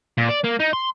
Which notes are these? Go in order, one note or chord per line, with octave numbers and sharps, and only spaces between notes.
A#2
D5
A#3
D#4
C6